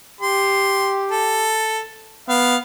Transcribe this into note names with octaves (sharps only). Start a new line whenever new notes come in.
G4 C6
A4
B3 F5